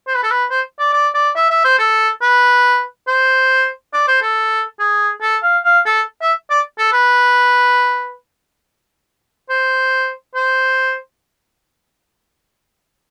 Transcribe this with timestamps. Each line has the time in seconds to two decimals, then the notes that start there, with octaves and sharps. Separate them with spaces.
0.07 C5
0.15 B4
0.23 A4
0.31 B4
0.51 C5
0.79 D5
0.93 D5
1.15 D5
1.36 E5
1.50 E5
1.65 C5
1.79 A4
2.22 B4
3.08 C5
3.94 D5
4.08 C5
4.22 A4
4.79 G#4
5.22 A4
5.43 F5
5.65 F5
5.86 A4
6.22 E5
6.50 D5
6.79 A4
6.93 B4
9.50 C5
10.35 C5